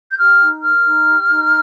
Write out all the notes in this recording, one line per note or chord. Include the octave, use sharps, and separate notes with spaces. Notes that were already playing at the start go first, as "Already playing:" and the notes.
G6
G4 F6
D#4
A#4 F6
D#4
G4
D#4